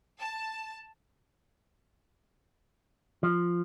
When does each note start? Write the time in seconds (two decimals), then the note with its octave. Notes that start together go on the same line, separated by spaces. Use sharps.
0.20 A5
3.23 F3